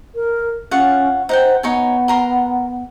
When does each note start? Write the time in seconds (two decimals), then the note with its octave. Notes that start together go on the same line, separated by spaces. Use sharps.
0.15 A#4
0.71 C#4 F4 C#5 F#5
1.29 D#4 C5 F#5 G5
1.63 B3 D#4 C#5 G#5
2.08 A#4 A#5 C6